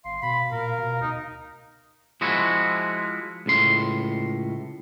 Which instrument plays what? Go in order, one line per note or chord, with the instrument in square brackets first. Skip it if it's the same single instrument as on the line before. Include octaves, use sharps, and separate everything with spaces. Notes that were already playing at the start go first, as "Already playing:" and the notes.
[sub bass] G1 [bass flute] F5 [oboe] C6
[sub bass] B2 [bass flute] F5 [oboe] B5
[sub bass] A#2 [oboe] A#4
[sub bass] B2
[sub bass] D2 [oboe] D#4
[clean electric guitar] F3 G#3 E4 F#4
C#2 A2 C6